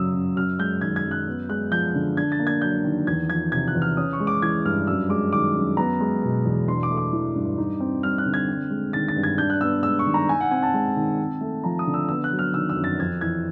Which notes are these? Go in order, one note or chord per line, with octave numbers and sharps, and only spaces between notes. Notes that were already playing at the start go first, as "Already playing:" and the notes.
Already playing: F#2 C#3 F#3 D#6 E6
F#2
F#2 F6
G#3 G6
D#3 G#6
G#6
F#2
F#6
B3
G#3 F#6
F3 G6
D3
D4 G#6
A6
A#3
G#6
F#3 G6
D#3
E2 G#6
F3 G#6
C3 G#6
F#6
E2
F6
C#4 D#6
C#6
G#3
D6
E3 G#6
G2 F6
F#2 E6
G#3 D6
D#3 D6
F#2
B3 A#5
G#3
B2
E2
D4 C6
D6
A3
D6
E3
G2
D#4
C4
G3 F6
F#6
D3
G#6
C4
G#3
D#3 A6
A6
G2
G#6
D4 G6
F#6
B3 E6
G#3 E6
C#6
D#3
A#5
D#4 G#5
F#5
C4 G#5
A5
G#3
D#3
C4
A3
F3 A#5
D#6
D3
E6
B3 E6
F#6
F#3
F6
D#3 E6
E6
F#2
A6
F2 G#6
E3 G#6